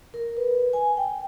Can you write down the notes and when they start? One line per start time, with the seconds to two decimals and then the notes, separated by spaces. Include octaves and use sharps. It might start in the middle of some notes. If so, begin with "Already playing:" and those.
0.14 A#4
0.37 B4
0.73 G#5
0.97 G5